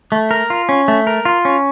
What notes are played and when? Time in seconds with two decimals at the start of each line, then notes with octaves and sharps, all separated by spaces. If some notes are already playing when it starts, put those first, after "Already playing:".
0.12 A3
0.31 A#4
0.50 F4
0.69 C#4
0.88 A3
1.07 A#4
1.25 F4
1.45 C#4